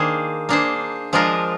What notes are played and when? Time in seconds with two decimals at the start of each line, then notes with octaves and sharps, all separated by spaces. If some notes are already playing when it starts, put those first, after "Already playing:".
Already playing: D#3 A#3 D4 G#4 C5
0.49 A#3 D4 G#4 C5
1.13 F3 G#3 D4 F4 A#4